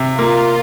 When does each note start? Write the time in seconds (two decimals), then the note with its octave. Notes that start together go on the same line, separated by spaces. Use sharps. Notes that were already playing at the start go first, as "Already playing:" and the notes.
Already playing: C3
0.19 A#3 F4